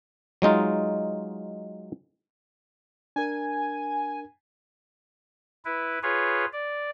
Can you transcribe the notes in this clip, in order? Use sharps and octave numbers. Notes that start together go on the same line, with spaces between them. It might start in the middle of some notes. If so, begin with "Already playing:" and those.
F#3 G#3 D#4 F4
D4 A#4 G#5
E4 B4
F4 G#4 B4 C#5
D5